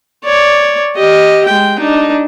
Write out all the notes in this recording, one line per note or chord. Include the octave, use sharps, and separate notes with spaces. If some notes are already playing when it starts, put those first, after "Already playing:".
C#5 D5
G4 D#5
G#3 G5
D4 D#4